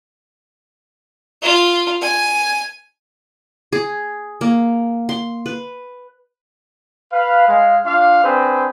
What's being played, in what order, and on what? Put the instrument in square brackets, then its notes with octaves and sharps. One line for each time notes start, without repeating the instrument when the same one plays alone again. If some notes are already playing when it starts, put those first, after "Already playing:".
[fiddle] F4
G#5
[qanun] G#4
A#3
C6
B4
[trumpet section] B4 F5
G#3 F5
D4 F4 F5
C4 D4 G#4 B4 C5